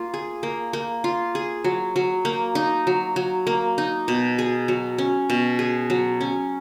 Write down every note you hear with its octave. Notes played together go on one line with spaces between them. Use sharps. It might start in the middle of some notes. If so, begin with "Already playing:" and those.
Already playing: A#3 F4
G#4
A#3
A#3
F4
G#4
F#3
F#3
A#3
D#4
F#3
F#3
A#3
D#4
B2
G#4
F#3
C#4
B2
G#4
F#3
C#4